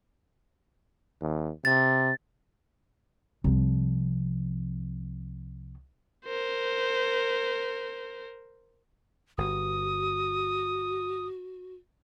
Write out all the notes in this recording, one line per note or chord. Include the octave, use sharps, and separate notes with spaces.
D#2
C3 A6
C2 F3
A#4 C5
G1 F#4 D#6